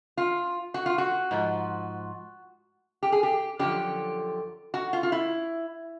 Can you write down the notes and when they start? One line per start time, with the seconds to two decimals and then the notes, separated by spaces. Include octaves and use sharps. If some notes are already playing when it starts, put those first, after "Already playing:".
0.17 F4
0.74 F#4
0.86 F4
0.98 F#4
1.31 G#2 F3
3.03 G4
3.12 G#4
3.23 G4
3.59 F#2 D3 F3 G4
4.74 F#4
4.93 F4
5.03 F4
5.12 E4